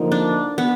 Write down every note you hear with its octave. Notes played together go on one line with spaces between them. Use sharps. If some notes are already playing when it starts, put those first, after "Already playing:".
Already playing: D3 F3 A#3 D#4 A#4
D4
B3